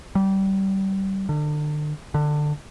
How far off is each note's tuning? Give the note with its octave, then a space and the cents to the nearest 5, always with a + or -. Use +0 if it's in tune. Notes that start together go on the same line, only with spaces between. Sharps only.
G3 -25
D3 +35
D3 +20